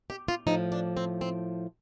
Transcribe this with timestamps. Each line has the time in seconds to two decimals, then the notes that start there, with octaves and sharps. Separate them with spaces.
0.10 G4
0.28 F4
0.47 A2 F3 D#4
0.72 D4
0.97 C4
1.21 C4